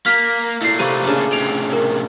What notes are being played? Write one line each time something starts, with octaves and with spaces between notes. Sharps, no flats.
A#3 F6 B6
A#2 A3 E4 C7
C3 A#3 B4 C#6 D#7
C#3 D4 A5
A2 C3 D7 F7
A#4